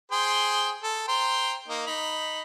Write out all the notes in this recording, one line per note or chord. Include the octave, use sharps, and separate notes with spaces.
G#4 C5 G5
A4
C5 G5 A#5
A#3 D#4
D#4 B5